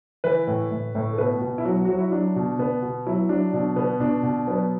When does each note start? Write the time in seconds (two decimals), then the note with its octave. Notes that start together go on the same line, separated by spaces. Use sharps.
0.24 E3 B4
0.47 A2
0.71 A2
0.95 A2
1.13 A4
1.18 B2 B4
1.42 B2
1.58 E4
1.65 F#3 F#4
1.85 F#3 F#4
1.98 E4
2.12 F#3 D4
2.36 B2
2.59 B2 B3
2.82 B2
3.06 F#3 E4
3.29 F#3 D4
3.53 B2 D4
3.76 B2 B3
4.00 B2 D4
4.23 B2
4.47 F#3 B3